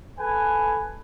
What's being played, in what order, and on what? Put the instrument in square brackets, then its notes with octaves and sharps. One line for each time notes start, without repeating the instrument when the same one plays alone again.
[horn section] A4 B4 G#5